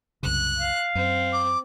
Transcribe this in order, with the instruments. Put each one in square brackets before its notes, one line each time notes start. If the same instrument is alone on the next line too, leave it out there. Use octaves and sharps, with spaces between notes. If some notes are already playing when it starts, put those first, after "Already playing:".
[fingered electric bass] C2 F#2 C#3 [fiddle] F#6
[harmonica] F5
[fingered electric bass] F#2 [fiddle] C4
[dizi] D6